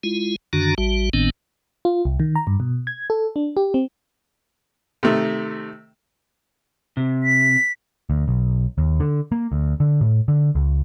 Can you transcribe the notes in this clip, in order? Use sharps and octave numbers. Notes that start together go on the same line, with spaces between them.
G#3 E4 F4
F#2 D3 D#3 D4 F#4 A#5
A1 G3 F#4
G#1 A2 D#3 B3 C4 D4
F4
C2
D#3
A#5
G2
B2
G#6
A4
D4
G4
C4
C3 D#3 A3
C3
B6
D2
B1
D#2
D3
A#3
D2
D3
A2
D3
C#2